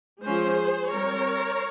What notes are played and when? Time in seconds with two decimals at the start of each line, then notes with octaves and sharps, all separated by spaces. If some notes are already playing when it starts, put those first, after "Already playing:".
0.24 F3 G#3 C#4 G#4 C5
0.91 G3 C4 A#4 C#5